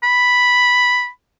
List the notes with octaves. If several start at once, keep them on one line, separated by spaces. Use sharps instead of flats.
B5